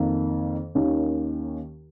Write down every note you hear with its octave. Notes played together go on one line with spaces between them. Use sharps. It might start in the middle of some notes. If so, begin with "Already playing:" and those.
Already playing: F2 D#3 A#3
D#2 D#3 A#3 C#4